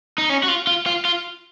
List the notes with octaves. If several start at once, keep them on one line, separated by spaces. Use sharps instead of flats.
D#4
C#4
F#4
F4
F4
F4
F4